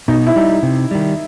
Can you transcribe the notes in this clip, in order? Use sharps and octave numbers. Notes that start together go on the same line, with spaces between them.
B2 D#4
E4
G3 D#4
C3
D#3 G3